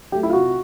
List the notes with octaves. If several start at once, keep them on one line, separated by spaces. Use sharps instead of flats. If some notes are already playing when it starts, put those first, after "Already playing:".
F#3 A3 G4
E4
F4
C3 F#4